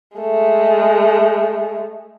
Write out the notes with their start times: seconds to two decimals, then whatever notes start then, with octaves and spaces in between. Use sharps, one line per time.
0.18 G#3 A3